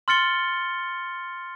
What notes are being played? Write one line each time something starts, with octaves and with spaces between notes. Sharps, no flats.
C6 F6 A6 C#7 G7